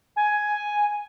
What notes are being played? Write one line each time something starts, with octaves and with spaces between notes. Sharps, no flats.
G#5